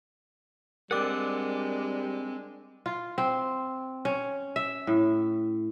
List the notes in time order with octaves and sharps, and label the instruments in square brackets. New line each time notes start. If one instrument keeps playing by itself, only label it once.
[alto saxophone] G3 [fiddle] G#3 D4 [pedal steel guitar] C4 D5 F#5 [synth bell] A#4 D6
[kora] F4
C4
C#4
E5
A2